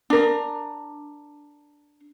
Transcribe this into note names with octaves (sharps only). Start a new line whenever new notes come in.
D4 A#4